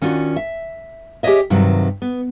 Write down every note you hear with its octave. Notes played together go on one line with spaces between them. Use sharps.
D#3 C#4 D4 F4 F#4
E5
G4 G#4 C5 C#5 D#5 E5
G2 C3 D#3 F#3
B3